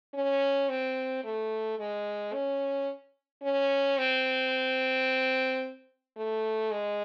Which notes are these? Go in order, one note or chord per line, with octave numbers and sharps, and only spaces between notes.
C#4
C4
A3
G#3
C#4
C#4
C4
A3
G#3